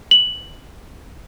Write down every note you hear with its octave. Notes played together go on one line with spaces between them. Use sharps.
F#7